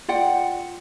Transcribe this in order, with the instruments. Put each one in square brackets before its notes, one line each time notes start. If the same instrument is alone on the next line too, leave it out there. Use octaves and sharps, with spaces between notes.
[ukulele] F4 D5 F#5 G5